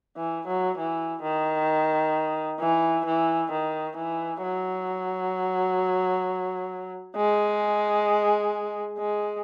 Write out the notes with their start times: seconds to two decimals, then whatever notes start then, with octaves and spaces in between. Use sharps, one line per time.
0.17 E3
0.47 F#3
0.78 E3
1.23 D#3
2.60 E3
3.06 E3
3.52 D#3
3.97 E3
4.43 F#3
7.16 G#3
8.98 G#3